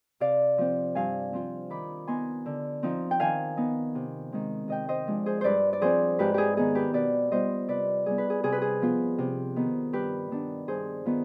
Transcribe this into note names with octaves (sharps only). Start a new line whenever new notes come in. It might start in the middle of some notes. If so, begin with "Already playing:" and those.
C3 D5 F5
F3 C4
G2 F5 G#5
F3 C4 F4
D#3 B5 D6
B3 D#4 G#5 C6
D3
F3 C4 D#4
G5
D#3 F5 G#5
B3 D#4
C3
D#3 G#3 C4
C3 D#5 G5
C5 D#5
F3 G#3 D4
G#4 C5
G2 B4 C5 D5
D5
F3 C4 G#4 C5
G#2 G4 B4
G4 G#4
D#3 B3 D#4 G#4
G4 B4
B2 B4 D5
G3 B3 F4 C5 D#5
C3 B4 D5
G3 B3 G#4
B4
G#4
C3 G#4
B4
G#4
F3 B3 F4
C3
D#3 B3
G2 G4 B4
D#3 B3 D4
G2 G#4 C5
D#3 B3 F4